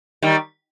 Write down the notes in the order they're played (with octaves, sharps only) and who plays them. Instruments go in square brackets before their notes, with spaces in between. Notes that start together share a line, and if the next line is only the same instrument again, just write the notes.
[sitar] D#3 G3